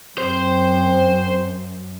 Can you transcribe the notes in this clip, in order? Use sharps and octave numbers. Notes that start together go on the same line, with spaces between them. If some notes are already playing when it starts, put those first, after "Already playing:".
F#2 C4 C5